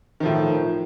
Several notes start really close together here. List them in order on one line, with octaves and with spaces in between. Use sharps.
D#3 F3 A2